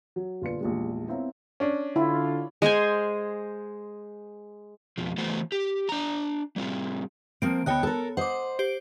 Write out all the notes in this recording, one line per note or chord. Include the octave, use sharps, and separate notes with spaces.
F#3
G1 A#2 F4 B4 D5 C#7
A#1 E2 A#2 G3 G#3
B3 C4 E4 C#5 F5 A#5
C#4 D4
D3 E4 F4
G#3 G#4 C5 G#5
F2 B2 F3
E3 A3 B3 F#4 A4 C5
G4
D4 A#5
G3 C4 F4
F3 A#3 C4 D7
D2 B3 C#5 D#5 G5 F#6
A4 A#4
C5 D#5 F#5 D6
G4 C5 D7